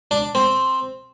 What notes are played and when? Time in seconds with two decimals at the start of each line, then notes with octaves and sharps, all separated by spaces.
0.11 D4
0.35 C4